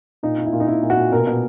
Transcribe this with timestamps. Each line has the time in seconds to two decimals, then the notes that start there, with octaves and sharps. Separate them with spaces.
0.23 A#2 D#4
0.38 A#2
0.46 E4
0.53 A#2
0.60 D#4
0.68 A#2 E4
0.82 A#2
0.90 F#4
0.97 A#2
1.12 B2 A#4
1.27 B2